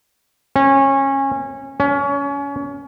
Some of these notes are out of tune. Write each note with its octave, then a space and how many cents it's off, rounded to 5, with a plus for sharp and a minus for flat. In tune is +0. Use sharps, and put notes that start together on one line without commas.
C#4 -25
C#4 +25